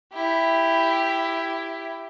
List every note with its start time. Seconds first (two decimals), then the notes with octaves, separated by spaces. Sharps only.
0.13 E4 G4